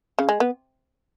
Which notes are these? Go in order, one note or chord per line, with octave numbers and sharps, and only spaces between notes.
C#3
G#3
B3